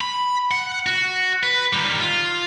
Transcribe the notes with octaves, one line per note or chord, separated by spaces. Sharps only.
B5
F#5
F#4
B4
D#3 G3
F4